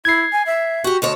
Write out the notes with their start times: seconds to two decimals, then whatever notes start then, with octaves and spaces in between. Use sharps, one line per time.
0.05 E4 G#6 C7
0.32 G#5
0.46 E5
0.84 F#4 G4
1.02 D2 A4 C#5 D#5